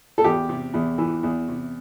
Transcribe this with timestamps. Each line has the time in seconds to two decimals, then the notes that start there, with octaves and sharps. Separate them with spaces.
0.18 A4
0.24 E2 G4
0.49 C3
0.74 E2
0.98 E3
1.23 E2
1.48 C3